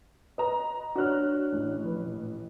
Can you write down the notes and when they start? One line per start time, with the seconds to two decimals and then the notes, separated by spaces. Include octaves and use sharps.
0.38 B4 D#5 A#5
0.96 D4 F#4 C#5 F6 F#6
1.52 A1
1.84 F3 B4
2.04 A#2